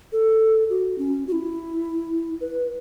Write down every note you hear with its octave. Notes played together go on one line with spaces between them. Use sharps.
A4
F#4
C#4
F#4
E4
B4